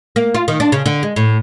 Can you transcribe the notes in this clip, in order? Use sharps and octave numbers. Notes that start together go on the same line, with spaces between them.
A#3
F4
D#3
D4
C#3
D3
G#3
A2